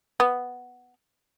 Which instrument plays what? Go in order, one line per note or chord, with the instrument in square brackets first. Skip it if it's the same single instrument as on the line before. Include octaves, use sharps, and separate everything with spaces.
[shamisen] B3